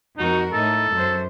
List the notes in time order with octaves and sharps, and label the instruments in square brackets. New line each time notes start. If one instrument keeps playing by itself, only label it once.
[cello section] F2 F#4 A#4 [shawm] D#4
[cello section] A2 D#4 [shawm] A4
[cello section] F#2 C5